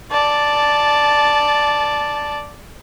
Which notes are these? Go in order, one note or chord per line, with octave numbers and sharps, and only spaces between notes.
D5 A5